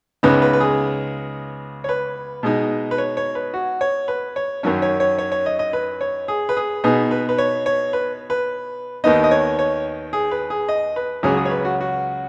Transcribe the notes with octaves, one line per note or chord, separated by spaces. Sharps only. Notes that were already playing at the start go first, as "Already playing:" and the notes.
C#2 C#3 G#3 B3 D#4 B4
B4
B4
G#4
C#5
B4
B2 G#3 D#4
B4
C#5
C#5
B4
F#4
C#5
B4
C#5
F#2 D#3 F#3 C#4 C#5
C#5
C#5
C#5
C#5
D#5
D#5
B4
C#5
G#4
B4
G#4
B2 B3 D#4 G#4
B4
B4
C#5
C#5
B4
B4
D#2 D#3 B3 D#4 D#5
D#5
C#5
C#5
G#4
B4
G#4
D#5
B4
C#2 C#3 F#3 C#4 G#4
G#4
C#5
B4
F#4
F#4